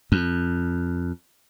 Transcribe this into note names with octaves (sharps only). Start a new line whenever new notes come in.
F2